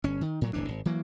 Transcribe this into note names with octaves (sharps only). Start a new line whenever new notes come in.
G1 C#4
D#3
A2 F#3
D1 G1 E3 D4
G#1
E3 F#3 A#3